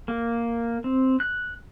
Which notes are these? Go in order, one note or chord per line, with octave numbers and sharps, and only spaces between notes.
A#3
C4
F#6